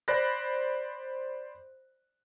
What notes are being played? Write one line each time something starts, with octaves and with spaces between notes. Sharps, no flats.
C5 D5 B5 F#6 A#6